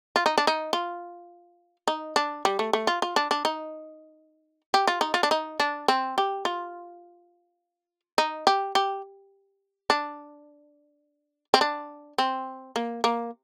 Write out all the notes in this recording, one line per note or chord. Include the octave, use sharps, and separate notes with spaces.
F4
D#4
D4
D#4
F4
D#4
D4
G3
A3
A3
F4
F4
D4
D4
D#4
G4
F4
D#4
F4
D4
D#4
D4
C4
G4
F4
D#4
G4
G4
D4
C4
D4
C4
A#3
A#3